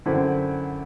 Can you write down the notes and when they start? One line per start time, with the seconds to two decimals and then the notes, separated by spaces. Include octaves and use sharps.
0.06 F#2 D3 C4 E4